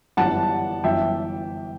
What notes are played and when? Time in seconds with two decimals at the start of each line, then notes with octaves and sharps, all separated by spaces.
0.17 G1 F#2 E3 G3 F#5 A5
0.84 G1 F#2 E3 E5 G5